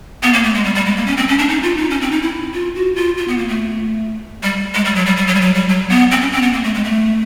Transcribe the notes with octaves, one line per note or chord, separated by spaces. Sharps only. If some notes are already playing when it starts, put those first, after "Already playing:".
B3
A#3
A3
G#3
G3
G3
G#3
A#3
C#4
C4
C#4
D4
D#4
F4
D#4
C#4
C4
D#4
E4
F4
F#4
F4
F4
B3
A#3
A3
G3
G#3
G3
F#3
G3
G3
F#3
G3
F#3
G3
F#3
B3
C4
C#4
C4
B3
A#3
A3
G#3
A3